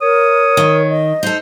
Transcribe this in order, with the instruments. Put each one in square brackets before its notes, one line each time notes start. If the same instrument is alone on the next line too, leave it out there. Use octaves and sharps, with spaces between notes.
[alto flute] A#4 [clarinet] C#5 [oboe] D#6
[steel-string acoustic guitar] D#3
[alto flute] D#5
[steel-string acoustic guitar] D#4 A4 [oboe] C5